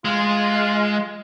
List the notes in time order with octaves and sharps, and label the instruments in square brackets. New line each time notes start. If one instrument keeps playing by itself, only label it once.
[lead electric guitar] G#3 [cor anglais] F4